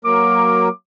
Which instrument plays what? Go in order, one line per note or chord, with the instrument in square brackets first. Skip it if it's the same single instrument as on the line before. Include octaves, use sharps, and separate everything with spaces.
[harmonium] F#3 A#3 A#4 [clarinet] D6